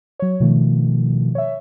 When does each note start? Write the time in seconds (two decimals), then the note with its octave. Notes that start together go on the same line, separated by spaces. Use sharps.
0.19 F#3 C#5
0.40 B2 D#3 F3 A3
1.35 C#5 E5